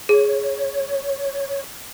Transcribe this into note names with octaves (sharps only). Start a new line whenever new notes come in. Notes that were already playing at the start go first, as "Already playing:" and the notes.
G#4 C#5